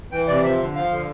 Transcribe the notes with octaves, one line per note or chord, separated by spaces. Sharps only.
E3 G5
C3 D5
F3 E5
D3
F3 F5
D3